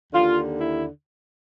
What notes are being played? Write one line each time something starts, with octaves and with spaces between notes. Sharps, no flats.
D#2 D3 F4
E4